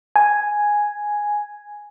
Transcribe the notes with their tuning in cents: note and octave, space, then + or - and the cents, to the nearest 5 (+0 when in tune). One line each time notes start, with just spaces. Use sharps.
G#5 +0